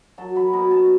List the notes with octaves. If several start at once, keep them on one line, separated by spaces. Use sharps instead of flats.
F#3 A5
F#3 B5
B2 A#5
B2 A5